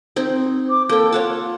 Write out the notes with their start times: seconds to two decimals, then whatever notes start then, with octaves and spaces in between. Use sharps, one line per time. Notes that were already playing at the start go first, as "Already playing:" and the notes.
0.16 C4 D#4
0.70 D6
0.89 A#3 A4 G5
1.12 F4 C#5 F#5 A5